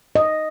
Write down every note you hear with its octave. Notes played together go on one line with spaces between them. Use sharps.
D#5